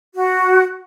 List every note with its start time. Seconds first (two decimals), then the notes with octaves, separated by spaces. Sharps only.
0.14 F#4